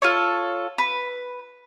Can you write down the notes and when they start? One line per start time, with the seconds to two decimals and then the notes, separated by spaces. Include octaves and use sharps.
0.02 F4 A4 C#5
0.78 B4